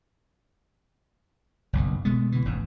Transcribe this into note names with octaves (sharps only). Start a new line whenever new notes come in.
F#1 B1 G2
B2 G#3 A3 B3
B2 D3 E3
E1 A1 G#2